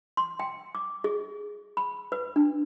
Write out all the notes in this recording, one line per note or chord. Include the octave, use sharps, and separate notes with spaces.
C6
G5
D6
G#4
B5
B4
D4